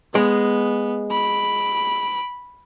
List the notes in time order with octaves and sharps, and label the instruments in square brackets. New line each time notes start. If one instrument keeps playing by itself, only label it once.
[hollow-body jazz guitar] G#3 [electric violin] B3
[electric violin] B5 D7